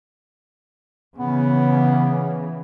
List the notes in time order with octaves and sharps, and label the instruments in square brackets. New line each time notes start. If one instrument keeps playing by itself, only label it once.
[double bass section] C#3 E3 [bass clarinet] B3